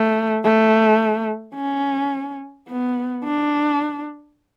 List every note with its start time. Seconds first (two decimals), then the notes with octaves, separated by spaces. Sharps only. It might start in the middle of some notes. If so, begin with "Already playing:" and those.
Already playing: A3
0.45 A3
1.56 C#4
2.68 B3
3.24 D4